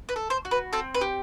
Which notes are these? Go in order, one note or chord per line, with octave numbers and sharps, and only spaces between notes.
B4
A4
C5
F#4
B4
C4 A4
B4
G4